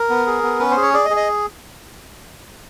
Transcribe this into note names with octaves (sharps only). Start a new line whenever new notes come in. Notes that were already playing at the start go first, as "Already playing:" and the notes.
Already playing: A#4
B3
G#4
B3
C#4 B4
C5
G#4
C#5
G#4 D5
D#5
G#4
D#5